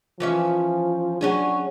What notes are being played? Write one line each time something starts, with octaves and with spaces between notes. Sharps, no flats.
E3 F3 C#4 E5
F#3 C#4 D4 G#4